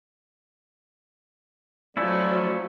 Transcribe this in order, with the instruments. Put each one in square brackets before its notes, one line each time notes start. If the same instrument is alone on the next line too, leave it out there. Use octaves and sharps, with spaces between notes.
[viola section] F3 F#3 [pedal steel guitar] A3 C#4 E4 [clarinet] D5